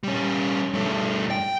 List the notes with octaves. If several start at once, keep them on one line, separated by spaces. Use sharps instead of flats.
G3 C#4
G2 A3
G5